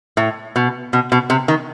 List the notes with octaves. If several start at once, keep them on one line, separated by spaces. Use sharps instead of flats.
A2
B2
B2
B2
C3
D#3